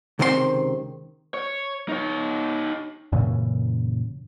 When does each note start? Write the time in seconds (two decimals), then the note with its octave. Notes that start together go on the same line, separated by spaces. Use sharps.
0.19 C#2 C3 D#3 C4 F#4 C6
1.34 C#5
1.89 D#4 C#5
3.12 F#2 A#2 C#3 E3